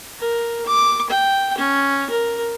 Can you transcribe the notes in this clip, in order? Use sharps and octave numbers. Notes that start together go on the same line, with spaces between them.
A#4
D6
G5
C#4
A#4